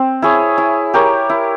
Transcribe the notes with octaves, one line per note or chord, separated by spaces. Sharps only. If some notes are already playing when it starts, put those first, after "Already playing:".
Already playing: C4
E4 G#4 C#5
E4
G4 A#4 C#5
E4